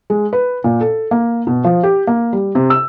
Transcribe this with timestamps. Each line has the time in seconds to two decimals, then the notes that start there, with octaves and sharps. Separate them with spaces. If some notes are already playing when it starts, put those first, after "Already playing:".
0.10 G#3
0.33 B4
0.64 A#2
0.81 A4
1.11 A#3
1.47 B2
1.64 F3
1.83 G4
2.07 A#3
2.33 G3
2.55 C3
2.70 E6